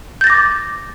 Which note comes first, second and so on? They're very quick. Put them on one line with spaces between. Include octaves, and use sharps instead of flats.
G6 A6 A#6 D6